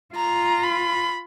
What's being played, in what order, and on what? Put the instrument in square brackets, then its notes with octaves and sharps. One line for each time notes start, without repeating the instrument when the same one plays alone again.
[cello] F4 [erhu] A#5
[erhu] B5